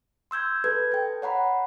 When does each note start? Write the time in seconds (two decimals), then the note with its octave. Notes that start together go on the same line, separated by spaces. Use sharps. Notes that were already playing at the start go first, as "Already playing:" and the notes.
0.31 C6 E6 G6 G#6
0.64 A4 B4 G#6
0.92 A4 G5
1.22 C#5 F#5 A#5 B5